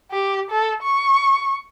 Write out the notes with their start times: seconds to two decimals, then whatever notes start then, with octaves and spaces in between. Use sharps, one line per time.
0.11 G4
0.51 A4
0.83 C#6